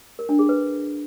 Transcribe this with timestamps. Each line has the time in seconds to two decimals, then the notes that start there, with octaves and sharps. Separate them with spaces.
0.19 A#4
0.29 D4
0.39 G#4
0.49 B4